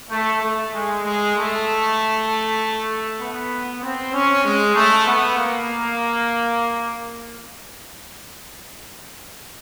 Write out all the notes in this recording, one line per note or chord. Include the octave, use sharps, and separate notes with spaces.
A3
A3
G#3
G#3
A3
B3
C4
C#4
G#3
A3
B3
A#3